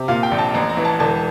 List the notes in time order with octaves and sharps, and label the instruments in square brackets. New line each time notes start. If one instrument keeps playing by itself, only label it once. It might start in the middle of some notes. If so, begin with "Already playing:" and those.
Already playing: [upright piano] C3
A#2 F5
G5
A#1
A5
A1 A#5
A#5
E3
A5
E1 A5